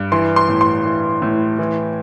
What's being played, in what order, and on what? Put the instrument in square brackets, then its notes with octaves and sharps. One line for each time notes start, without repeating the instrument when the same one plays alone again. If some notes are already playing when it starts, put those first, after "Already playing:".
Already playing: [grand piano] G2
E3 C6
C6
A2
C6
E3
A2
E3